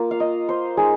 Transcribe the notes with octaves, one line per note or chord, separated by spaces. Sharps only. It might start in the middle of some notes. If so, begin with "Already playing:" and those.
Already playing: A#3 F4
F5
D#5
C5
G#3 D#4 G#4